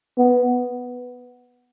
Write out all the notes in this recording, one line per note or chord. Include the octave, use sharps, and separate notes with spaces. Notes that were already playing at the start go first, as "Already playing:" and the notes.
B3